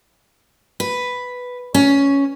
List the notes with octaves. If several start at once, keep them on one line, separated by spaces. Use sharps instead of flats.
B4
C#4